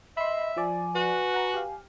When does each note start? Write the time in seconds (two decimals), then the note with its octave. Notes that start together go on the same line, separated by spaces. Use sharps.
0.17 D#5 E5 B5 C6
0.57 F3 D5 G#5
0.95 F#4 B4
1.34 F#5 A#5
1.54 G4 F5